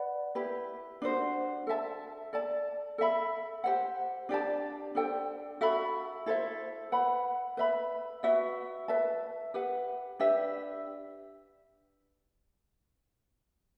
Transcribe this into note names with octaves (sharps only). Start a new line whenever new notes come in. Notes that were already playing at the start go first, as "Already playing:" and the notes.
Already playing: B4 D5 F#5 B5
E4 G4 B4
D4 F#4 C5
A4 E5 A5
A4 D5 A5
A4 E5 B5
G4 C5 F#5
D4 G4 D5 A5
D4 A4 C5 G5
F#4 A4 E5 B5
E4 A4 C5 E5
B4 F#5 B5
B4 E5 B5
F#4 B4 E5
B4 E5 A5
G4 B4 F#5
D4 G4 B4 E5